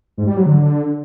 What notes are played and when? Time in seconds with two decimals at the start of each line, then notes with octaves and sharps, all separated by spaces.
0.18 G#2
0.27 G3
0.37 F#3
0.46 D3